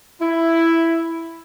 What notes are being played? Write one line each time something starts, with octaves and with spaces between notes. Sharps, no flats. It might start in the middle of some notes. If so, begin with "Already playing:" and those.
E4